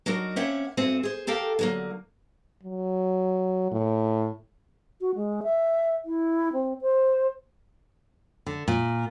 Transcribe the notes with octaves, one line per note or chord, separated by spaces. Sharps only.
F#3 D4 D#4 F#4 A#4
A#3 C4 C#4 E5 F#5
G2 A3 C4 F#4 F#5 G#5
G#4 C5
G4 A4 A#4 F5 G5
D3 F#3 A#3
F#3
A2
F#4
G#3
E5
E4
C4
C5
D3
A#2